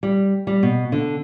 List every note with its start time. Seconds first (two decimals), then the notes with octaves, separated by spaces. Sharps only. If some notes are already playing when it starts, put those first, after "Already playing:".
0.03 G3
0.47 G3
0.63 B2
0.92 D3